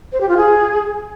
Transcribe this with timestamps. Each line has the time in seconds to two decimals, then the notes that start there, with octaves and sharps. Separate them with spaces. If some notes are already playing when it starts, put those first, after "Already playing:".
0.12 C5
0.21 G4
0.29 F4
0.37 G#4